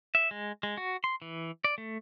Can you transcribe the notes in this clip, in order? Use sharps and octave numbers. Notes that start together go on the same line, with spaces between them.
E5
G#3
G#3
F#4
C6
E3
D5
A3